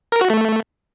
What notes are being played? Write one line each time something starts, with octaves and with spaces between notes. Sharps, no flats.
A#4
F#4
A3